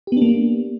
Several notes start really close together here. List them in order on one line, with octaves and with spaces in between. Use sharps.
G4 B3 D4 A#3